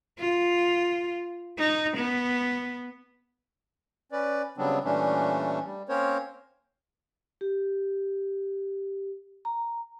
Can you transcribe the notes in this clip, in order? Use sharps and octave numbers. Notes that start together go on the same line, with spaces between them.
F4
D#4
B3
C#4 B4 D5
C#3 F#3 G3 B3 C4 D4
A#2 E3 G3 A3 C#4 D4
G3
A#3 C4 C#4 A#4 C5 C#5
G4
A#5